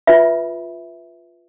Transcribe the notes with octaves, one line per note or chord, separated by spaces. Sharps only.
F4 B4 E5 B5